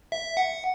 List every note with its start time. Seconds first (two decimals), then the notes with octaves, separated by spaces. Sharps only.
0.12 E5
0.37 F#5